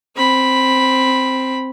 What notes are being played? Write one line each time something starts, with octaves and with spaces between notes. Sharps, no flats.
C4 B5